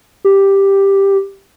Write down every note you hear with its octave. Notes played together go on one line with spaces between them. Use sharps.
G4